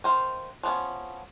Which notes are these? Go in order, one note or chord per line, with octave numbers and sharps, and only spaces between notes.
D#3 C5 F5
F3 B3 C#4